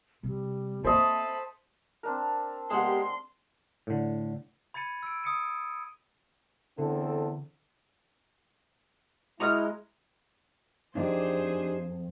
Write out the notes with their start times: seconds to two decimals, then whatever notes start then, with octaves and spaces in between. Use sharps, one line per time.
0.23 C3 G3
0.84 A#3 C4 A4 C5 D#5 E5 B5
2.03 C4 D4 A#4
2.70 G#3 A#3 B3 G4 C5 F#5 C6
3.87 A2 D3
4.74 B5 G#6 A6 C#7 D#7
5.03 E6 D7
5.24 D#6 C#7 D#7
6.78 E2 D3 C4 A4
9.40 G#3 E4 F#4 D#5 A#5 D#6 F6
10.95 F2 D4 D#4 G4 G#4 C5